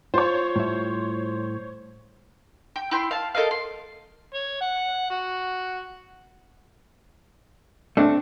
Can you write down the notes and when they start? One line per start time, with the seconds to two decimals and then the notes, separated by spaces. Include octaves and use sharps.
0.14 F4 C5 C#5
0.56 A2 G3 E5
2.76 G5
2.91 E4 G5 C6
3.11 F5 A5
3.35 A4 A#4 D#5 F5
3.51 C6
4.34 C#5
4.61 F#5
5.11 F#4
7.97 A3 C4 D4